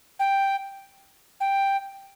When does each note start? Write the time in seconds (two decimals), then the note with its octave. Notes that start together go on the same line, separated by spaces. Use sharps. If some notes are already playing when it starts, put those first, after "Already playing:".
0.20 G5
1.40 G5